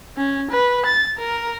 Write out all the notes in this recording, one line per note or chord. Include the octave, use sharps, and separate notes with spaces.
C#4
B4
A6
A#4